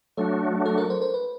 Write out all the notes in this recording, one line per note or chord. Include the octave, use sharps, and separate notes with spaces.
F#3 A3 D4 F#4 A4
A4
A#4
C5
C5
B4